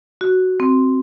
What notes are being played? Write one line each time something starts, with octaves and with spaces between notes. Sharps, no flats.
F#4
C4